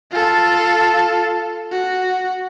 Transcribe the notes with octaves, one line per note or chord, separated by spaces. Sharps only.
F4 A4
F#4